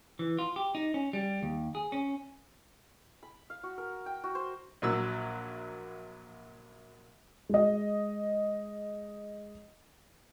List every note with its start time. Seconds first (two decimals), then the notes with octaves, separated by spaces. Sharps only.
0.19 E3
0.39 F4
0.56 G4
0.75 D#4
0.94 C#4
1.13 G3
1.43 D#2
1.75 G#4
1.92 C#4
3.23 B5
3.50 F5
3.63 F#4
3.78 A#4
4.06 G5
4.24 F#4
4.35 C5
4.82 A#1 A#2 F#3 E6
7.49 G#3 D#5